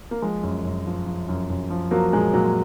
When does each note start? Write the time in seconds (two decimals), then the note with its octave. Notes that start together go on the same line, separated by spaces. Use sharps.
0.11 A#3
0.22 F3 G#3
0.43 F#2
0.65 F#2
0.86 F3
1.06 F3
1.29 F#2
1.50 F#2
1.70 F3
1.91 F3 F#3 A#3
2.13 A#2 G#3
2.33 A#2 F#3